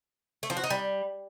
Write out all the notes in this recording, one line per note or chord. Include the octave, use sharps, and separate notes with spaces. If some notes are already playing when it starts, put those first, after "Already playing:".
A3
F3
F#4
D#4
G3